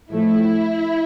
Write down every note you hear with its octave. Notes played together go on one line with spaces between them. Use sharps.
A2 F3 A3 E4